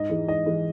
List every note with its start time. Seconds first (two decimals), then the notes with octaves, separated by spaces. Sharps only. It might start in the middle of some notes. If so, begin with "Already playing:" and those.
Already playing: G#2 D#5
0.10 E3 G#3
0.28 G#2 D#5
0.46 E3 G#3